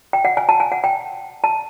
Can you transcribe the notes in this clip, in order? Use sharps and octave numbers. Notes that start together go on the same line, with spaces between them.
G5
F#5
G#5
A5
G#5
F#5
G5
A5